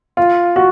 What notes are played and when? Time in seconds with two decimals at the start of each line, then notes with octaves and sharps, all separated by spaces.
0.17 F4
0.56 F#4